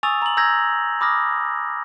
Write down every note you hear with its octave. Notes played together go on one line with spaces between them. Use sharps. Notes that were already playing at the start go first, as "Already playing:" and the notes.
G#5 C#6 D#6 E6 A6 F7
A#5 F#7
A#5 E6 G6 G#6 A#6
B5 D6 D#6 F6 A#6